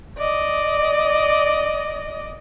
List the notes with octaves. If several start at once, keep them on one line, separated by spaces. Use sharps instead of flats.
D5 D#5